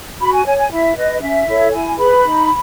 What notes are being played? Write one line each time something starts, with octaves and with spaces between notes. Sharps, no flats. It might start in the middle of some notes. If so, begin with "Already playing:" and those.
F#4 B5
G#5
C#5 G#5
G#5
E4 E5
B4 D#5
C#4 E5
E4 A4 C#5
E4 G#5
G#4 B4 B5
D#4